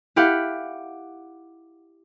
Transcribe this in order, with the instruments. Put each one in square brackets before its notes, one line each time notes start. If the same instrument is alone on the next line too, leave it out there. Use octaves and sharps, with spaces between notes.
[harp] E4 G4 F5 F#5